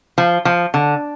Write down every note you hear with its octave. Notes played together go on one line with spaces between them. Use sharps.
F3
F3
D3